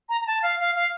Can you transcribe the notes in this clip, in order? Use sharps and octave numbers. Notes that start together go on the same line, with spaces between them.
A#5
A#5
A5
F5
F5
F5